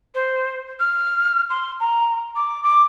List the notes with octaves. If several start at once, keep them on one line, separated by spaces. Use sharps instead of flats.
C5
F6
C6
A#5
D6
D6